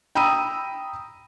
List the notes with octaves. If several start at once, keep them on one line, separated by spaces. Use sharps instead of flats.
G5 A#5 B5 D#6 E6 D#7